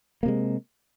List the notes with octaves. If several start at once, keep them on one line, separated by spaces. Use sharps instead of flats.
C3 G#3 A#3